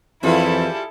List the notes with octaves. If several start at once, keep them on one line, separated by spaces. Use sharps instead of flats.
F2 E3 G3 E4 F4 G#4 A4